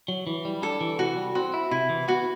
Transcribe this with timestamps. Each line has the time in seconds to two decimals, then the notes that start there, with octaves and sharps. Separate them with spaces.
0.08 F#3
0.27 E3
0.45 G3
0.62 D4 A4
0.81 E3
0.99 C3 F#4
1.17 G3
1.35 C4 F#4
1.54 E4
1.71 C3 E4
1.89 E3
2.08 B3 F#4